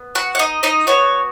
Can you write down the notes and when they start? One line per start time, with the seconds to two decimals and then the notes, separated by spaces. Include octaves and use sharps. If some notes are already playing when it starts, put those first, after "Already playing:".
Already playing: B3
0.15 F#4 F#5
0.35 F#5
0.39 D#4 D#5
0.63 D#4 D#5
0.87 B3 F#4 C#5